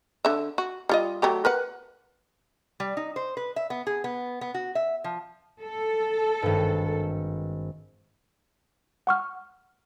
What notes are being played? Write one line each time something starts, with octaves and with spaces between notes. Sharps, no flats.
D3 E5
F#4
G3 F4 D#5
F#3 A3 G4
A#4 B4 F#5
G3
D#4
C5
B4
E5
B3
G#4
B3
B3
F#4
E5
F3
A4
G#1 G2
F#5 C#6 F6